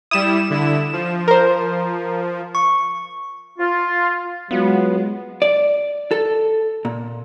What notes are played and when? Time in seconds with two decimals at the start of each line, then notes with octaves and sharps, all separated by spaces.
0.11 G3 E4 D#6 E7
0.50 D3 E4
0.93 F3
1.28 A#4 C5
2.55 C#6
3.59 F4
4.51 F#3 G#3 B3 F4
5.42 D5
6.11 A4
6.85 A#2